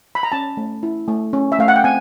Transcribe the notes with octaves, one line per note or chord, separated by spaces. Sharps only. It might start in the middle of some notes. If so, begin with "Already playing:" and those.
B5
A#5
C#4 A5
A3
E4
A3
C#4
E5
A3 F5
F#5
G5
C4 G#5